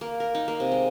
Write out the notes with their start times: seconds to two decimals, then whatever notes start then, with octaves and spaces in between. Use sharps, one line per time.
0.01 A#3
0.20 A#4
0.35 D#4
0.48 A#3
0.60 C3
0.72 G#3